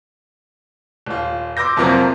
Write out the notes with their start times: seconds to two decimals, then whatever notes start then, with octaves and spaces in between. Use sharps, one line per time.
1.07 D#1 F4
1.57 C6 D6 E6 G6 A#6
1.76 C2 F2 C3 F3 F#3 A#3